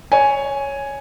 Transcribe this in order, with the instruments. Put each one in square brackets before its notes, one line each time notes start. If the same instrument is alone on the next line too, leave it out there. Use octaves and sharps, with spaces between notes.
[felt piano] C#5 G#5